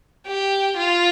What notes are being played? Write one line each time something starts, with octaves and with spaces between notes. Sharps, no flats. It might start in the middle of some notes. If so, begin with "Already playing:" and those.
G4
F4